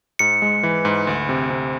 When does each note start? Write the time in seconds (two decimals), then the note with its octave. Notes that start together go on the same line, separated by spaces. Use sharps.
0.19 G#2 C#7
0.42 G#3
0.63 E3
0.85 G#2
1.07 D2
1.29 C3
1.50 C3